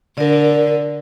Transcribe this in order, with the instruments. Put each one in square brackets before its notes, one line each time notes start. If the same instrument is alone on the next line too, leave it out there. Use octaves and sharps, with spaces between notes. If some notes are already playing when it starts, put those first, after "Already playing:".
[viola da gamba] D3 [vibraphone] A#4 D5